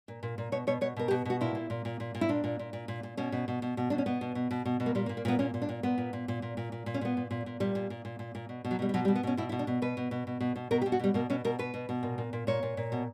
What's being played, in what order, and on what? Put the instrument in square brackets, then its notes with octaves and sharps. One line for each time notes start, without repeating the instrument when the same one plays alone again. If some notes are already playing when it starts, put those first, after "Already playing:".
[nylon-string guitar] A#2
A#2
A#2
B2 C#5
B2 C#5
B2 C#5
B2 A#4
G4
B2
B2 F#4
A#2 E4
A#2
A#2
A#2
A#2
A#2
E4
A#2 D4
A#2
A#2
A#2
A#2
A#2
B2 C#4
B2
B2
B2
B2
B2 D4
C#4
B2 B3
B2
B2
B2
B2
B2
A#3
A#2 G3
A#3
A#2
A#3
A#2 B3
A#2 C#4
A#2
D4
A#2
A#2 B3
A#2
A#2
A#2
A#2
A#2
A#2
A#2
C#4
A#2 B3
A#2
A#2
A#2
A#2 G3
A#2
A#2
A#2
A#2
A#2
B2
B2
F#3
B2 G3
G3
B2 F#3
G3
B2
B3
B2 C#4
B2 E4
E4
B2
D4
B2
B2 B4
B2
B2
B2
B2
B2
B2 A#4
G4
B2
F#4
B2 G3
B2 A#3
B2 C#4
B2 A#4
B2 B4
B2
B2
A#2
A#2
A#2
A#2 C#5
A#2
A#2
B2